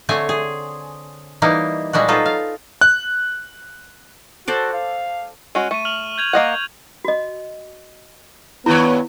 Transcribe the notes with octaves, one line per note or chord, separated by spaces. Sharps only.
D3 A3 C4 C#5 G#5
G#4
E3 G3 A#3 D#4
A#2 G3 G#3 D4 F#4
F#3 D#4 F4 A4 B4
F5
F#6
F#4 A4 C5 D5
F5
G#3 C#4 F#4 D#7
A3 C#6 D#7
F6 F7 F#7
G6 G#6 F7
A#3 D#5 F#5
F#4 D#5
G2 D#3 B3 E4 C#5